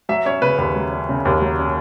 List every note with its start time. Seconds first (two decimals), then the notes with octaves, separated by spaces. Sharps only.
0.09 F#3 E5
0.25 C#4 C#5
0.42 C#3 B4
0.58 D#2 B4
0.76 F#3
0.91 C#4
1.09 C#3
1.25 D#2
1.41 F#3
1.59 C#4